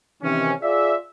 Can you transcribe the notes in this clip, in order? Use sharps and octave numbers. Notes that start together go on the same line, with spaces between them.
C3 D#3 E3 C#4
F4 G#4 D5 E5